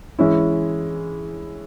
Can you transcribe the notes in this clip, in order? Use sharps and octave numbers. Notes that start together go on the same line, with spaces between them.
E3 G#3 C#4 E4